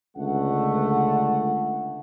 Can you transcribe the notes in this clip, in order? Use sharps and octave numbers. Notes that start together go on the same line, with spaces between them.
C#2 D3 A3 F#5